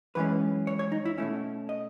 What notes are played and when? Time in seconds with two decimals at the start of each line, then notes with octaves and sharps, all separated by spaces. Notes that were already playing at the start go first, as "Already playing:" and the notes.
0.15 F#2 E3 G#3 C#4 B4
0.67 C#5
0.79 C#5
0.92 D#4
1.05 E4
1.18 B2 A3 C#4 E4
1.69 D#5